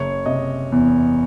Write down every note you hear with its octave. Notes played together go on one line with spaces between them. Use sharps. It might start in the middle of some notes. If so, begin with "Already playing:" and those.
Already playing: F#1 C#5
C3 D#5
E2